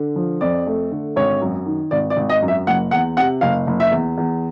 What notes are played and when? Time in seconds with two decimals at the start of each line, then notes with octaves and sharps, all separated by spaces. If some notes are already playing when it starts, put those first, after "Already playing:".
Already playing: D3
0.16 F3
0.41 F2 D5
0.67 A3
0.91 D3
1.16 G#1 C#5
1.41 F#2
1.66 D#3
1.91 G#1 D5
2.10 D5
2.17 G#1
2.29 D#5
2.42 F#2
2.48 E5
2.67 F#1 F#5
2.91 E2 F#5
3.17 C3 F#5
3.41 F#1 F5
3.67 F#1
3.80 E5
3.91 E2
4.18 E2